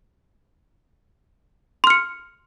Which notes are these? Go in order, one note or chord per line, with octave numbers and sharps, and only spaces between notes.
C6 F6 C#7